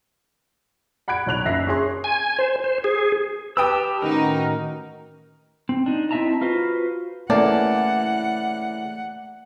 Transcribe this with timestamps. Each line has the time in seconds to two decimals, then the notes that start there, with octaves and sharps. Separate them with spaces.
1.08 F#5 B5 F#6 G#6 D7
1.26 B1 C#5 F#6 F7
1.45 F#1 E5 A#6 C7
1.67 C#4 G#4 C6
2.04 G#5
2.39 C5
2.64 C5
2.84 G#4
3.57 G4 B4 G5 A5 D#6 E6
4.02 A2 D#3 C#4 D#4 F#4 A#4
5.69 C4
5.86 D4 D#4
6.11 C4 E4 D#5 E5 A5 A#5
6.41 F4 F#4 B4 C5
7.30 C#3 E3 A3 A#3 D5 F#5 A5